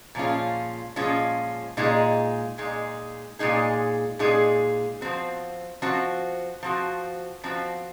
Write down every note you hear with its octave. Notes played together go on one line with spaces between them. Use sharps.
A#2 F3 G#3 C#4 F4
A#2 F3 G#3 C#4 F4
A#2 G#3 D#4 G#4
A#2 G#3 D#4 G#4
A#2 G#3 D#4 G#4
A#2 G#3 D#4 G#4
F3 C4 F#4
F3 C4 F#4
F3 C4 F#4
F3 C4 F#4